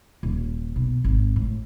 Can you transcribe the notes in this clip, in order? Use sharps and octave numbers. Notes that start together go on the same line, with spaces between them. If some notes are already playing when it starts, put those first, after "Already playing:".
D#1
B1
G#1
A2